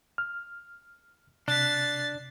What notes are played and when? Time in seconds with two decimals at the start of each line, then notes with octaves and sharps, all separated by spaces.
0.18 F6
1.48 C3 D4 F#6 A6 B6 C7